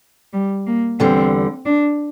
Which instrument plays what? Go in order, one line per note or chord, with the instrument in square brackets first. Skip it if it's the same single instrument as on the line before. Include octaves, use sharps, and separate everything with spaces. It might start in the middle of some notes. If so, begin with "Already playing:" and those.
[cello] G3
A#3
[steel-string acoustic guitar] E2 D3 G3 [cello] C4
[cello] D4